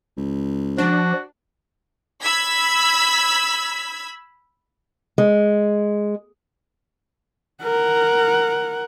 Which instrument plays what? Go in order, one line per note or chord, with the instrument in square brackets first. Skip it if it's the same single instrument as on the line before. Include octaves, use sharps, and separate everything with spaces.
[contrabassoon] C#2
[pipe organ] F3 [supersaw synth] D4 [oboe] F#4
[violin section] B5 E6 G#6 B6
[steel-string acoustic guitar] G#3
[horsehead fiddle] A#4 F#5